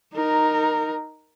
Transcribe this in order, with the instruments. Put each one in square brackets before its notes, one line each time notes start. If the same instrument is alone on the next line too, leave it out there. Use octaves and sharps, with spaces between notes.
[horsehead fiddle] D#4 A#4